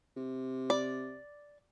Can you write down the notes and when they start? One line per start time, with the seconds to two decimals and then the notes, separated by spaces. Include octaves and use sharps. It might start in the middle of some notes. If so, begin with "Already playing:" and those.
0.17 C3
0.70 D5